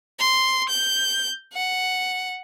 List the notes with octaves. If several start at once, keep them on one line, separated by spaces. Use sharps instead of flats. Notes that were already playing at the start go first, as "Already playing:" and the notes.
C6
G6
F#5